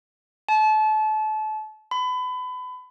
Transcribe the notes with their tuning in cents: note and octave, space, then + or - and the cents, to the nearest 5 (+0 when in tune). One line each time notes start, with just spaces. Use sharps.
A5 -30
B5 +30